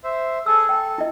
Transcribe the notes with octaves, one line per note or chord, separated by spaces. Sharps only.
C5 E5
G#4 A4 E6
A4 G5
E4 D#5